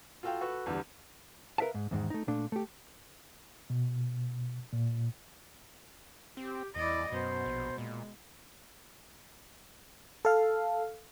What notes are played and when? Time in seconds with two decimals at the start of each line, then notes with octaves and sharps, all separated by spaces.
0.23 F4 F#4 A4 F5 G5
0.41 F#4 A4 B4 C#6
0.66 E2 D3 G3
1.58 A#4 B4 E5 F5 A5
1.74 G#2
1.91 E2 G#2 D#3
2.10 A3 D#4
2.28 A#2 A3 D4
2.52 A3 G4
3.70 B2
4.73 A#2
6.37 C4 G4
6.76 E2 E4 D5 D#5
7.12 F#2 B2 C5
7.46 A#1
7.78 A#2 G#3
10.25 A4 F5